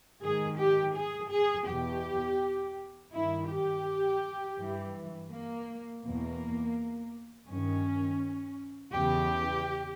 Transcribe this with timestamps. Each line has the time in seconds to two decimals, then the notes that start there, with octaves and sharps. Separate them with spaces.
0.22 G#2 D#3 G#4
0.58 G4
0.95 G#4
1.31 G#4
1.67 E2 B2 G4
3.12 G2 D#3 E4
3.49 G4
4.57 G2 E3
5.30 A#3
6.02 E2 B2 A#3
7.48 G2 D#3 C#4
8.93 E2 C#3 E3 G4